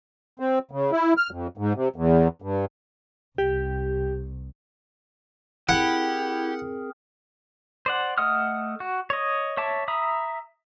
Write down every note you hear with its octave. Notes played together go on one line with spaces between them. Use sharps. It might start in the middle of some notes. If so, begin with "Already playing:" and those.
C4
C#3
E4
F6
F2
G#2
C3
E2
G2
C2 G4
C4 E4 G4 G#4 A#4 F#5
C5 D5 F#5
A3 D#5 F#5 D#6 F6
F#4
C#5 D#5
C#5 E5 A5 D6
E5 A#5 B5 D#6